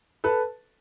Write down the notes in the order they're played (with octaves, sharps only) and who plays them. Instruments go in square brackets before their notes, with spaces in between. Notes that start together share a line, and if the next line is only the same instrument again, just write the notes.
[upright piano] A4 B4